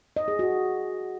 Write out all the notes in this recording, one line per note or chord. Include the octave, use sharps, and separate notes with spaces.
D#5
G#4
F#4